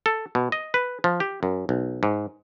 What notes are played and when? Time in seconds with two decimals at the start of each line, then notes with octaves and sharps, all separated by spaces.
0.06 A4
0.35 B2
0.52 D#5
0.74 B4
1.04 F3
1.20 G4
1.43 F#2
1.69 B1
2.03 G#2